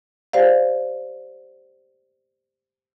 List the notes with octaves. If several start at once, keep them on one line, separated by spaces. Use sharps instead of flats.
G4 C5 D5 F5